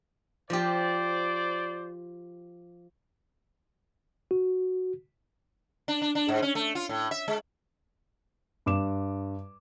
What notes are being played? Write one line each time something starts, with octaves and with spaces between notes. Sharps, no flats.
F3 G4 C5 D5
F#4
D4
D4
D4
G#2
C#4
A3
F4
A2
E5
G#3
G2 D6 E7